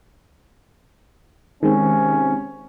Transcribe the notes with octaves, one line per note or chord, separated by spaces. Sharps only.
C3 D#3 G#3 C4 C#4